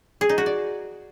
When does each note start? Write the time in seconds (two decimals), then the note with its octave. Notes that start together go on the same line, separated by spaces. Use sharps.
0.21 G#4
0.29 D#4
0.38 F#4
0.46 D5